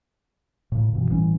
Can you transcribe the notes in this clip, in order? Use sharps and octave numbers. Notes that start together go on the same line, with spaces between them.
A2 C#3
G2 B2 E3
A1 E3 G3 C#4